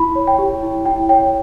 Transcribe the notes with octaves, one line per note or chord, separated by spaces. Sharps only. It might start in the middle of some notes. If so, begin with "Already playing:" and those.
Already playing: E4 B5
C#5
G5
G4
E4
E4 G5
C#5 G5